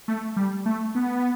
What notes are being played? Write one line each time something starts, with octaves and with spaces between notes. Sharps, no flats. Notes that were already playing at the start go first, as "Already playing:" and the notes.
A3
G3
A3
B3